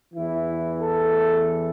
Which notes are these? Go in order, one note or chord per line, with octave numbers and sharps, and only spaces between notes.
E2 E3 E4
A4